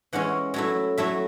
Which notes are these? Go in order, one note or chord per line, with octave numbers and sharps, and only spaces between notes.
E3 G#3 C#4 F#5
F#3 A3 E4
F#3 A3 E4 E5